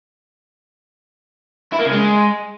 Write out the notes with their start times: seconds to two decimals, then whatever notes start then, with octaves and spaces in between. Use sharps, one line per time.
1.73 E4
1.79 A#3
1.85 C#3
1.92 G#3